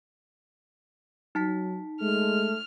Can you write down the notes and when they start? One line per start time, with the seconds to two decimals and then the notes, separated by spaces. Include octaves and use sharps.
1.35 F#3 D#4 A5 B6
2.01 G#3 A3 F6